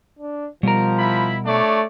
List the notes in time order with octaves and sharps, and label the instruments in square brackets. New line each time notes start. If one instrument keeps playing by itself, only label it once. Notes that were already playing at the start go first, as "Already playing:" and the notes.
[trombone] D4
[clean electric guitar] B2 A#4 [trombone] F3 [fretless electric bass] G3
[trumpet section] E4 B5
[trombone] A3 [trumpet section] D4 C#5 D5